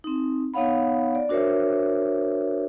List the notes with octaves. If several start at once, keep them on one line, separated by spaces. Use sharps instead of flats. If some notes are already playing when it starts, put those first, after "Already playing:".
C4 D#4
B3 D#4 C#5 F5 F#5 B5
D5
D4 F#4 A#4 C5 C#5 E5